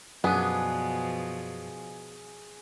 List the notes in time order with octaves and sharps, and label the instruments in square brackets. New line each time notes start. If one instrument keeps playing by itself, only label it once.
[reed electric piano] F#2 D#6 [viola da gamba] B2 F3 [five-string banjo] B3 D4 [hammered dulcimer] G#4